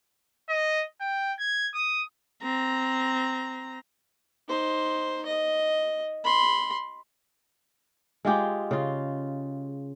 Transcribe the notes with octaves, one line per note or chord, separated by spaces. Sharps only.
D#5
G5
G#6
D#6
C4 A#5
D#4 C5
D#5
B5 C6
G#3 F4 G4 G#4
C#3 F4